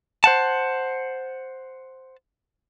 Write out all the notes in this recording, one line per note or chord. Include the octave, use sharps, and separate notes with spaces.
C5 F#5 A5